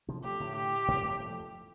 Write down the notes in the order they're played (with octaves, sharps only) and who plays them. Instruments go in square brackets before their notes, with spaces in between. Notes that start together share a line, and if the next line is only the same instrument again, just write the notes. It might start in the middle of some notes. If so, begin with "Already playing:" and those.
[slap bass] C3 F3
[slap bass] F3 A3 [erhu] G4
[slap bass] A2 D3
[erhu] G4
[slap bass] G2 C3
F2 A2
F3 A3